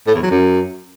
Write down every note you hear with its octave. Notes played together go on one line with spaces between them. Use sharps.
A2
E2
F#3
F#2